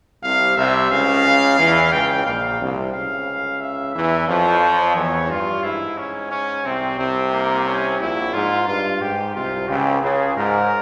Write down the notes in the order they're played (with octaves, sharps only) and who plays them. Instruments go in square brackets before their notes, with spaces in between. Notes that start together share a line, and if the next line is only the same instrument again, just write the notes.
[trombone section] C2 C3 [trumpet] F5
[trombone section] C2 C3 [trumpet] E5
[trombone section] C#2 C#3 [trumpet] F5
[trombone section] E2 E3
[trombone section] C#2 C#3 [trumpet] G5
[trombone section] A#1 A#2 [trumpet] F5
[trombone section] C2 C3
[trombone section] C#2 C#3 [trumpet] F5
[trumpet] E5
[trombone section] E2 E3 [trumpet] E5
[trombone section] F2 F3 [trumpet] C#5
[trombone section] E2 E3 [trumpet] C#5
[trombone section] G2 [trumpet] F4
[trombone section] G#2 [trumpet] E4
[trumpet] C#4
C#4
[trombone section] C2 C3 [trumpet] C4
[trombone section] C2 C3 [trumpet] C4
[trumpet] A#3
C#4
[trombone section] A#1 A#2 [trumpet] E4
[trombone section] G#2 [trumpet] F4
[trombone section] G2 [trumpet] F4
[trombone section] G#2 [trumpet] G4
[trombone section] C2 C3 [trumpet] F4
[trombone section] C#2 C#3 [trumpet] G4
[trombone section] C#2 C#3 [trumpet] G#4
[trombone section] G#2 [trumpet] A#4